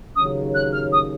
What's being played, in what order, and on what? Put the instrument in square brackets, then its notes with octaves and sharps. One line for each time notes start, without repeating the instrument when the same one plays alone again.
[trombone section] D#2 C#3 F#3 C#4 [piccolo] D#6
[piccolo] F#6
F6
D#6